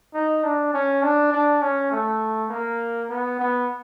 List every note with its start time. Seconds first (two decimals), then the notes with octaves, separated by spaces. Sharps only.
0.14 D#4
0.44 D4
0.73 C#4
1.02 D4
1.32 D4
1.61 C#4
1.91 A3
2.49 A#3
3.09 B3
3.39 B3